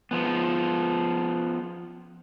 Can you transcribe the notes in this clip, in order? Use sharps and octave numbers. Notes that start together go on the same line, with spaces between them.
F3 B3